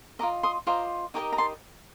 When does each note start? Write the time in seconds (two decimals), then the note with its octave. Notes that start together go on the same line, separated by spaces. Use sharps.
0.19 F4 A#4 D#5 A#5 D6
0.43 C6 D#6
0.67 F4 C5 D#5 A#5 D6
1.14 D#4 G4 A#4 D#5 A#5 D6
1.33 A#5
1.38 A5 C6